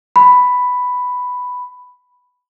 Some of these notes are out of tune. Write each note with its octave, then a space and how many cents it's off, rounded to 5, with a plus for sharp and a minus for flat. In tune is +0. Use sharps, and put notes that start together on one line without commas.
B5 +5